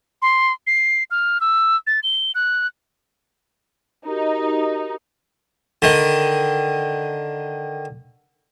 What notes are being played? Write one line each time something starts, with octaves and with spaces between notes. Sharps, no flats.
C6
C7
F6
E6
A6
G7
F#6
D#4 F#4 G4 A#4
D3 D#3